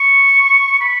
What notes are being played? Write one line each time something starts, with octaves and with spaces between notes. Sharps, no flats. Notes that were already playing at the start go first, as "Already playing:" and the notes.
Already playing: C#6
B5